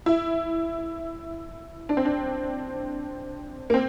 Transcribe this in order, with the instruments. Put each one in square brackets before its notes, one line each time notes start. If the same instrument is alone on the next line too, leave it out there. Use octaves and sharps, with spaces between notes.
[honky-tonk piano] E4
D4
C4
D4
A#3
C4